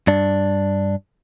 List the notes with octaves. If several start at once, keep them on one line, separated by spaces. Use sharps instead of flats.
G2 D4